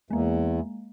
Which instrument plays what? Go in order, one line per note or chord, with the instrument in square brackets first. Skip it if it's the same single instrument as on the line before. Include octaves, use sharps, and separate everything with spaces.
[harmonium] E2 [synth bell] G#3 A#3